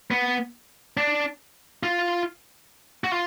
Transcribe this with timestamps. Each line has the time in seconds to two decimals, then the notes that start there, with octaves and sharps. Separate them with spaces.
0.11 B3
0.97 D4
1.83 F4
3.04 F#4
3.12 F4